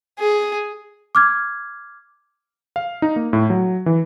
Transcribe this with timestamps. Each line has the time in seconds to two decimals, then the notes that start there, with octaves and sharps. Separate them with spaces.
0.20 G#4
1.15 D6 F6 G#6
2.76 F5
3.02 D#4
3.16 A#3
3.33 A2
3.50 F#3
3.86 E3